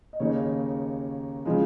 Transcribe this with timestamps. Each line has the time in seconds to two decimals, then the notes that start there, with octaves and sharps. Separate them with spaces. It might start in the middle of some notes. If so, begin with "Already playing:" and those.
0.13 D#5
0.20 D#2 C#3 A#3 D#4 C#5
1.46 C#3 F3 G#3